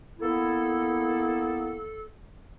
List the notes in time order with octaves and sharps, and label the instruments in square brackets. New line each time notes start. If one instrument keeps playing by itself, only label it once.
[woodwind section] A#3 B3 E4 [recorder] A4